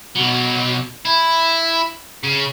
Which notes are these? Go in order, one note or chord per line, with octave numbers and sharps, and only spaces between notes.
B1 F#3
E4
C#3